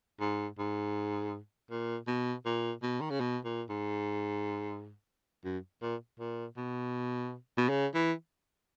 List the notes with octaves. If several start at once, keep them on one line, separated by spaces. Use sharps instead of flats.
G#2
G#2
A#2
B2
A#2
B2
D#3
C#3
B2
A#2
G#2
F#2
A#2
A#2
B2
B2
C#3
E3